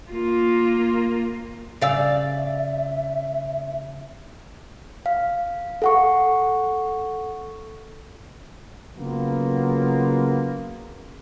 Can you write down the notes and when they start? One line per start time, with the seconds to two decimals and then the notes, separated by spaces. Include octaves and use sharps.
0.11 A#3 F4
1.81 C#3 D5 E5 F5 E6
5.06 F5
5.82 A4 F#5 C#6
8.97 C#3 F#3 A#3 B3 F4